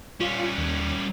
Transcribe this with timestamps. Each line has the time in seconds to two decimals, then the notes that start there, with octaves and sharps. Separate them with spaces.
0.20 G3 C#4 F4
0.58 D#2